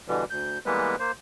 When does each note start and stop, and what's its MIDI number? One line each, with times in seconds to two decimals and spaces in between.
0.08 0.24 47
0.08 0.24 50
0.08 0.24 52
0.08 0.24 55
0.30 0.58 38
0.30 0.58 91
0.66 0.96 52
0.66 0.96 55
0.66 0.96 56
0.66 0.96 58
0.66 0.96 59
0.66 0.96 71
0.99 1.12 58
0.99 1.12 72